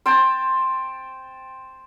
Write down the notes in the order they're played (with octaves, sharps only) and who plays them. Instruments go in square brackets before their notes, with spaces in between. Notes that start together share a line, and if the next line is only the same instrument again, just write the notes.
[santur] C5 G5 A5